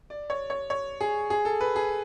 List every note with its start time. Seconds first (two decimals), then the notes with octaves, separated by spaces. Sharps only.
0.10 D5
0.30 C#5
0.50 C#5
0.70 C#5
1.01 G#4
1.30 G#4
1.45 A4
1.61 B4
1.76 G#4